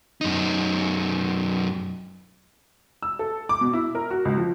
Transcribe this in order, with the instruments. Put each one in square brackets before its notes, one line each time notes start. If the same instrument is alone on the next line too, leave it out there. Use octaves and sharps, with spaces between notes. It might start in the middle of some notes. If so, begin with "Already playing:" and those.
[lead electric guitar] F#2 D#4
[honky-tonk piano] E6
A4
D6
B2
E4
A#4
F#4
C#2
F3